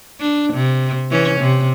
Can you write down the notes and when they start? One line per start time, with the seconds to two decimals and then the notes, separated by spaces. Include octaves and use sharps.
0.20 D4
0.53 C3
1.11 E3 C#4
1.40 C3